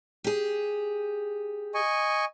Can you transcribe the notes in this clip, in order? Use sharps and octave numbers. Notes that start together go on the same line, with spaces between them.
G4 G#4
D#5 G#5 C#6